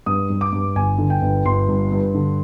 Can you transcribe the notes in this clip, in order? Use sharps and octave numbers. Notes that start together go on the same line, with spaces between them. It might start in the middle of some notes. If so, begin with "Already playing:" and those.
G2 D#6
G2
D6
G2
G1 G#5
D3
G5
G1
G1 C6
G2
G2
D3